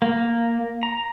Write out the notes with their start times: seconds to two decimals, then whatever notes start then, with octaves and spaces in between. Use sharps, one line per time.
0.02 A#3
0.83 A#5